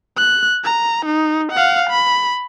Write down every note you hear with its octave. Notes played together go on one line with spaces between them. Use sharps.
F#6
A#5
D#4
F5 F#5
B5